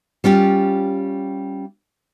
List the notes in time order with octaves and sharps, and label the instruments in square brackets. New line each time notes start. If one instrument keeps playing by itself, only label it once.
[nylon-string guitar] G3 C#4 F4 G4